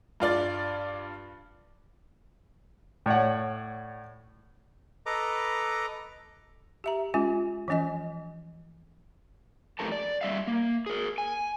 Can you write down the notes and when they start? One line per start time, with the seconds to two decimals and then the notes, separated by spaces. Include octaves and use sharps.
0.20 G2 F4 D5 A6
3.06 A2 C#5 D5 F#5
5.06 A4 B4 D#5 A#5 D6
6.84 G4 E5 A#5
7.14 G#3 C#4 F4 G#5
7.68 E3 F3 C#4 D#5 G#5
9.79 F2 E3 A3 G4 A#4 A5
9.92 D5
10.21 G3 E5 F5
10.47 A#3
10.86 G#4 A#4
11.18 G#5